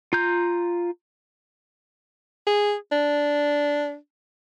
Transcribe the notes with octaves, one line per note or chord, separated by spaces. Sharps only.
F4 A#5 G6
G#4
D4